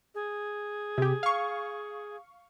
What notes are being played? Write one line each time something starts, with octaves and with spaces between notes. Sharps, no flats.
G#4
C3 G4
F5 C#6